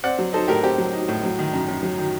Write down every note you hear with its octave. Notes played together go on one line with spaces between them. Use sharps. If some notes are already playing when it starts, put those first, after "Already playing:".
C4 D5 F#5
F#3
D#4 A4 C5
A2 G4 A#4
C4 G4
F#3
D#4
A2
F#3
D#3
F#2
F#2
F#3
D#3